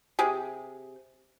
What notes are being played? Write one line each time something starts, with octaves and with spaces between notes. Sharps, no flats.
C3 G4 G#4